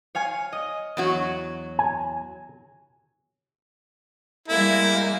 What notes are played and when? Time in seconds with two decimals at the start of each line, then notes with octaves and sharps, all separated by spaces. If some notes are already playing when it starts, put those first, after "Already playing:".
0.15 C#5 F5 G#5
0.53 D#5
0.97 E2 F#3 F#4
1.79 G#5
4.48 G3 G#3 A#3 E4